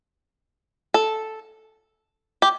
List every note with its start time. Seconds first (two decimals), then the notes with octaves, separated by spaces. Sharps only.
0.94 A4
2.42 G4